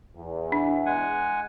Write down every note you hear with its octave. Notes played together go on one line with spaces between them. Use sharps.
E2
D4
G#3 F#5 G#5